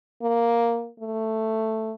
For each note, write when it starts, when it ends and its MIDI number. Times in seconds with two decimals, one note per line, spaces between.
0.22 0.89 58
1.00 1.94 57